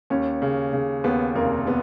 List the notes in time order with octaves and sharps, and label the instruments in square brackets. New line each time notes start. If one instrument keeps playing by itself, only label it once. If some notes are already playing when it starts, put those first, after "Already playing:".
[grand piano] D#2 [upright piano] C#4
[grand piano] C#3
C#3
[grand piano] D#2 [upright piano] B3
[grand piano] F1 [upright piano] A#3
[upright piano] B3